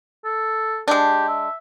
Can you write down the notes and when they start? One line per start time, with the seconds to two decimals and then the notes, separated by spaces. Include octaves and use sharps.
0.24 A4
0.88 G#3 D4 G4
1.28 E5